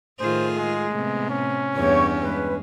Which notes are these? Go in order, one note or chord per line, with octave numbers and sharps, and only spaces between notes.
A2 D#3 F4 G#4 C5
G#3
A2 C3 B3
C#4
E2 G2 G4 C#5 C#6
G#3 B4